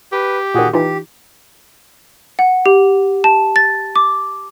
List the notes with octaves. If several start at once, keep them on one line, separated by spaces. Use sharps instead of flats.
G4 B4
A#2 D#3 F#4 G#4
E3 D#4 F4 G4
F#5
G4
A5
A6
D6